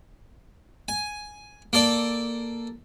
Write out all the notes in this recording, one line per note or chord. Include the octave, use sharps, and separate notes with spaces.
G#5
A#3 A4 D5